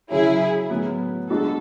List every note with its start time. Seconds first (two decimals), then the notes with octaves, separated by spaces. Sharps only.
0.10 C#3 F#3 C#4 E4 G#4
0.70 A2 F#3 B3
1.30 G#3 B3 D4 F#4 A4